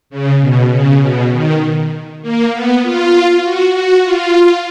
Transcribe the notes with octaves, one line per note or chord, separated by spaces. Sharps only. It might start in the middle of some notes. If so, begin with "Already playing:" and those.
C#3
B2
C#3
B2
D#3
A#3
B3
F4
F#4
F#4
F4